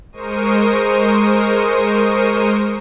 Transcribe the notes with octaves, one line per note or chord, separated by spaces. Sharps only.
G#3 A#4 C5 C#6 D#6 D#7